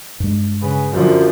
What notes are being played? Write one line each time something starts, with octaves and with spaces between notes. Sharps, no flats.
G2 G#3
C#3 G#4 B4
F#2 D3 F3